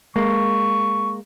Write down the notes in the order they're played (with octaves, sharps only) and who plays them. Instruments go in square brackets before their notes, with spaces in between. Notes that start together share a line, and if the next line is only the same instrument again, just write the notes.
[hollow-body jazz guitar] G#3 A#3 [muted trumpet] C#6